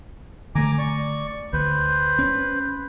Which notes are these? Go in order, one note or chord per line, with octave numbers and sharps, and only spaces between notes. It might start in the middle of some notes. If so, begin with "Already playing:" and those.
D3 A3 G#5 A#5 D6
D5 C#6
D2 B4 C5
C#4